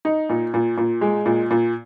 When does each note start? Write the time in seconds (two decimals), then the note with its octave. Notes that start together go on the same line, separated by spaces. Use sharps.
0.05 D#4
0.29 A#2
0.54 A#2
0.77 A#2
1.01 G#3
1.26 A#2
1.51 A#2